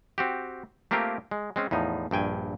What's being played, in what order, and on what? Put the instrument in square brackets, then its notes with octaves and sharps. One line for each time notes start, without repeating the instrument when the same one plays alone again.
[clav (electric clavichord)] C4 F#4 G4
A3 A#3 C4 F4 G4 A#4
G#3
G#3 C4 C#4
E2 A2 F3 D#4
A#1 G2 G5 G#5